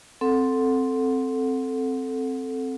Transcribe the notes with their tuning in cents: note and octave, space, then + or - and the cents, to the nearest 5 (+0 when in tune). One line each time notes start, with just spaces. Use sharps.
C4 +0 A4 +0 F#5 -20